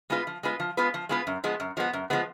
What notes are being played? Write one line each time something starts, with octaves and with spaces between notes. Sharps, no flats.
G#3 B3 F4 B4
F3
G#3 B3 F4 B4
F3
G#3 B3 F4 B4
F3
G#3 B3 F4 B4
F#2
F3 G#3 B3
F#2
F3 G#3 B3
F#2
F3 G#3 B3